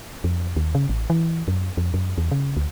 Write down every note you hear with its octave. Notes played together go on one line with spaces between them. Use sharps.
F2
D#2
C#3
A1
E3
F#2
F2
F#2
E2
C#3
D2